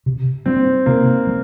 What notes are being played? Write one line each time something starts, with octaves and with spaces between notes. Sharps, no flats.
C3
G3 A#3 C4 D4
C3 A#3
G3